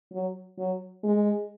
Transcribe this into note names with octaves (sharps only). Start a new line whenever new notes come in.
F#3
F#3
G#3